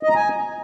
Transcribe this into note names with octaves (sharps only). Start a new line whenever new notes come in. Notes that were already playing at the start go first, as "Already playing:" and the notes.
D#5
A#5
G#5